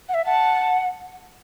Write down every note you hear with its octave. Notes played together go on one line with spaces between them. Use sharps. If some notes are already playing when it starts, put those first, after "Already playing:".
F#5
E5
F#5 A5